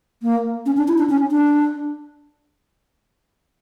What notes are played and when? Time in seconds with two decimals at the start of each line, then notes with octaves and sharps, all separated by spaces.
0.22 A#3
0.66 C#4
0.77 D4
0.88 E4
0.98 D4
1.09 C#4
1.31 D4